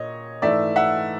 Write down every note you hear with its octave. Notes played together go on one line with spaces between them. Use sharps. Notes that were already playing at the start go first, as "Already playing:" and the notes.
Already playing: A#2 C#5 D#5
G#2 E3 A3 D5 E5
E5 F#5